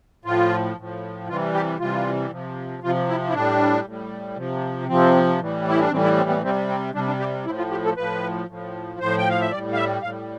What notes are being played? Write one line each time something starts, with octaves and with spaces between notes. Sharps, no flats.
A2 F3 F4
A2 F3
C3 E3 G3 F4
G4
C3 E3 G3 F4
C3 F3
C3 F3 F4
E4
E4
A2 G3 D4
A2 G3
C3 F3
C3 F3 C4
A2 E3 G3
E4
D4
A2 E3 G3 C4
E4
C4
B3
C3 G3 C4
C4
C3 G3 D4
D4
G4
A2 F3 E4
F4
G4
A4
A2 F3 B4
A2 F3
A2 F3 C5
G5
F5
E5
A2 G3 D5
F5
E5
A2 G3 F5